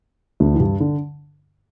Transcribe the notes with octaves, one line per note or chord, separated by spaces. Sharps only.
D2 D3
E3
G2 G3
D3